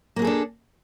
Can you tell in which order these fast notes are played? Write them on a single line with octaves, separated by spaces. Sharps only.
A#3 B3 G#4 A4 D4